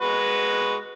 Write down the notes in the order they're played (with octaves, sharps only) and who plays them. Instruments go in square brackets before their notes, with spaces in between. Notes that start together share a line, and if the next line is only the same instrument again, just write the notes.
[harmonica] G#3 F#4 B4